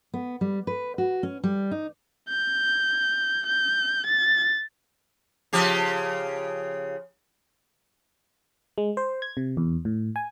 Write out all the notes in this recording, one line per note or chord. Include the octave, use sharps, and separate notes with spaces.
B3
G3
B4
F#4
C#4
G3
D#4
G6
G6
A6
C#3 F3 G4
G#3
C5
G#6
C3
E2
A2
G#5